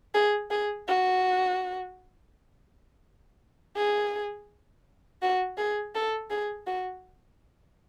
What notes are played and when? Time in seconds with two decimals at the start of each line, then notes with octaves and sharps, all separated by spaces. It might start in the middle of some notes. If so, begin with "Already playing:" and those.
0.14 G#4
0.51 G#4
0.87 F#4
3.76 G#4
5.22 F#4
5.58 G#4
5.95 A4
6.30 G#4
6.67 F#4